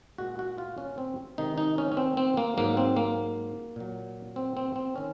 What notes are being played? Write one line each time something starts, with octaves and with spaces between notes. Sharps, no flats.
A#2 G#3 F#4
F#4
F4
C#4
C4
C3 D#3 G#3 D#4
D#4
C#4
C#4
C4
C4
A#3
G#2 F#3 A#3
C4
A#3
A#2 F#3
C4
C4
C4
D#3 C#4